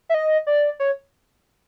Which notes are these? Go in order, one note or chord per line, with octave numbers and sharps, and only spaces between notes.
E5
D#5
D5
C#5